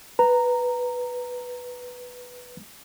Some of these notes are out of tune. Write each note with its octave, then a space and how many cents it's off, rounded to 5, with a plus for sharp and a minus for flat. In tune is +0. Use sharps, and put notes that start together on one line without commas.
B4 +0 A#5 -10